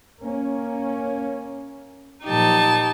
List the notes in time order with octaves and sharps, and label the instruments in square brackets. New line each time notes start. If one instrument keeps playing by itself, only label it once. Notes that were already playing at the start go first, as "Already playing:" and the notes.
[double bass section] A#3 C#4
[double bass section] A#2 F3 F#3 [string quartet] D#4 G4 A5